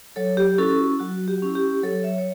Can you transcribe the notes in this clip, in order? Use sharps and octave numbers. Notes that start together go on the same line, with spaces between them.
F#3 A4 C#5
G4
C#4 E4 F#4 A4
F#3 F#4
G4
C#4 E4
G4
F#3 A4 C#5
C#5 E5
C#5